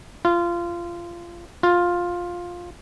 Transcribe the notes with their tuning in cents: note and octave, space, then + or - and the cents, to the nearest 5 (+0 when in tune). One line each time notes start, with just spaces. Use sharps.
F4 -20
F4 +10